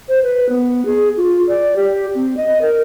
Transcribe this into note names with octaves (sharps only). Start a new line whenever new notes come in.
C5
B4
B3
G#4
F4
D5
G4
C4
D#5
A#4